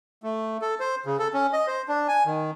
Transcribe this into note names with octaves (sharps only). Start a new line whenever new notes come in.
A3
A4
C5
C#3
A4
C#4
D#5
C5
D4
G#5
D#3